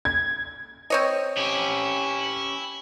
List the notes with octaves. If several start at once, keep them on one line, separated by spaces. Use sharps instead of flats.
G#6
C4 C#5 D#5
C#4 E4 G4